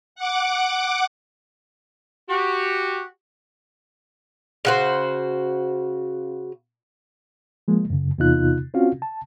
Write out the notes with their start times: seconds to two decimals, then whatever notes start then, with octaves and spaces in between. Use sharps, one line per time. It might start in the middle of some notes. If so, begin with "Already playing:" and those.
0.16 F#5 D6
2.29 F#4 G4
4.65 C#3 F#4 C5
7.68 F3 G#3 A#3
7.90 F#2 C#3
8.18 E2 C3 B3 D#4 F4 F#6
8.74 C4 C#4 F4 F#4 F5
9.02 A5